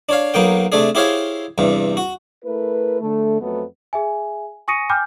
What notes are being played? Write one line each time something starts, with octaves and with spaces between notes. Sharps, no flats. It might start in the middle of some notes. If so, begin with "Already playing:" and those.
D4 C#5 F5
B1 F#3 A#3 B3 G5
C3 A3 D4 G#4
E4 G4 G#4 C5 C#5 F5
E2 G2 C3
F#4
A3 E4 A#4 B4
D3 A3
F2 F#3 A3 B3
G#4 E5 G#5
G#5 C#6 D#6 A#6 C#7 D#7
G5 G#5 B5 D6 F6 G6